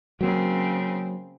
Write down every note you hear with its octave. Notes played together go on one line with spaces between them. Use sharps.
C#3 F#3 A#3 C4